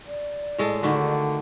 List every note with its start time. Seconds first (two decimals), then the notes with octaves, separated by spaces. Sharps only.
0.07 D5
0.58 A2 G#3 A4
0.83 D3 D#3 A3 F#4